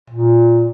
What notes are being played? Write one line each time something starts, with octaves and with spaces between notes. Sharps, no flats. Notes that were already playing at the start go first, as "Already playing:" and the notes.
A#2